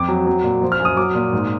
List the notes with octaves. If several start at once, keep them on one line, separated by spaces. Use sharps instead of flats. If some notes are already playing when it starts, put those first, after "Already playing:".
Already playing: F2 D6
F#3
F#3
A#2
F3
F6
F#2
D#6
F#3 D6
A#2
G#2